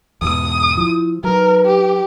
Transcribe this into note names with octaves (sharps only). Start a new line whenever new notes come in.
E2 G#2 B2 D#6
F3 E4
F#3 D#4 A#4 B4
G4